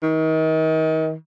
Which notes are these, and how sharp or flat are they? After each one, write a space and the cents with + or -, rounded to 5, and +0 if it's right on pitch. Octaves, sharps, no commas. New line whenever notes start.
D#3 +35